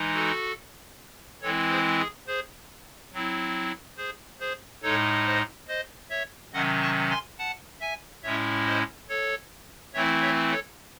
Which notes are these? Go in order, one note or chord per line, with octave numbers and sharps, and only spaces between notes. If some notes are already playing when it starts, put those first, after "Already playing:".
Already playing: E3 G#3 D#4
F#4 A4
E3 G#3 C4 E4 A4 C#5
G#4 C5
G#4
G#4 C5
F#3 C4 E4
G#4 C5
G#4 C5
A2 G#3 D#4 A4 C#5
C5 D#5
C5 D#5
C#5 E5
C3 D#3 F#3 C#4 D#5 F#5
A5 C#6
G#5 C6
F#5 A5
E5 G#5
A2 G#3 C#4 E4 C#5 E5
C5 D#5
A4 C#5
E3 A3 C4 E4 C#5 E5
C#5 E5
A4 C#5